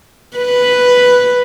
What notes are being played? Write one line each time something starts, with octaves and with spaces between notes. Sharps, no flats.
B4